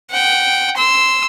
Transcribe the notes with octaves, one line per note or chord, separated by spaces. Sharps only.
F#5 G5
C6 E6